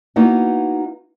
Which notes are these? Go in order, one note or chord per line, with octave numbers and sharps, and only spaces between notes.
A#3 B3 D#4 E4 F#4